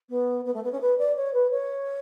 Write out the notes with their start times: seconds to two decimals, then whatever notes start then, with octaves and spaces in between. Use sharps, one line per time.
0.09 B3
0.45 B3
0.54 A3
0.63 B3
0.72 C#4
0.81 B4
0.98 D5
1.16 C#5
1.33 B4
1.51 C#5